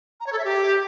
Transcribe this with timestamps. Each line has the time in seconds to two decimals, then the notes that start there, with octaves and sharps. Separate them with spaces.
0.20 A#5
0.26 C#5
0.33 A4
0.39 E5
0.45 G4